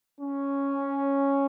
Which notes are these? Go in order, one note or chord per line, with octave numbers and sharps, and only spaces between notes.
C#4